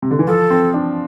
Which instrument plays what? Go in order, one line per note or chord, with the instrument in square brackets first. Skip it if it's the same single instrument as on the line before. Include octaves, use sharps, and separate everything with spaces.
[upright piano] C3
D3
E3
[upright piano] F3 [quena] A4
[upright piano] C4
D4